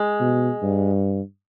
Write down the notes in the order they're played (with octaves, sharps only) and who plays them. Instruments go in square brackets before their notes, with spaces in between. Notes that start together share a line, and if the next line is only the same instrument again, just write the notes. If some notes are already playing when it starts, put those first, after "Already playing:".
Already playing: [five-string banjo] G#3
[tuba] B2
G2